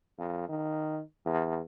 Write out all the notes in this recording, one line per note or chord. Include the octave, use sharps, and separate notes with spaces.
F2
D#3
E2